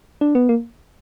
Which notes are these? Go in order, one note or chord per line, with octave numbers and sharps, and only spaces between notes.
D4
B3
A#3